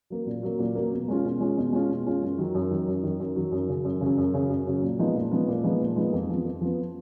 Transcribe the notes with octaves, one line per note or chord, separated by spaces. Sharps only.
F#3 A#3
A#2
F#3 A#3
A#2
F#3 A#3
B2
G#3 C#4 F4
B2
G#3 C#4 F4
B2
G#3 C#4 F4
B2
G#3 C#4 F4
F#2
D#3 F#3
F#2
D#3 F#3
F#2
D#3 F#3
F#2
D#3 F#3
F#2
C#3 F#3 C#4
F#2
C#3 F#3 C#4
F#2
C#3 F#3 C#4
F#2
C#3 F#3 C#4
A#2
F3 G#3 B3 D#4
A#2
F3 G#3 B3 D#4
A#2
F3 G#3 B3 D#4
A#2
F3 G#3 B3 D#4
F2
F3 B3
F2
F3 B3